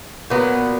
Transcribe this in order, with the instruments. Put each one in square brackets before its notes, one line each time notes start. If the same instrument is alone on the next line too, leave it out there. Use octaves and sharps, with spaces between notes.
[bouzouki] A#2 F#3 B3